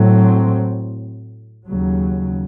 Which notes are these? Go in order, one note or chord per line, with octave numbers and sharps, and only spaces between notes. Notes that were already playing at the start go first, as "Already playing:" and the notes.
Already playing: A2 F#3 C4
D#2 C#3 F#3